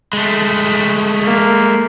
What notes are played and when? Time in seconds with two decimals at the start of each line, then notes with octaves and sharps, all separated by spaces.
0.13 G#3 A3
1.25 A#3